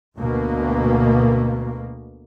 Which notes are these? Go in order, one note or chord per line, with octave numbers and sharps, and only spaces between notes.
D2 B2 A#3